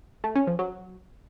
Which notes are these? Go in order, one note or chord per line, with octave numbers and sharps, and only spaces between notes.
A3
C#4
F3
F#3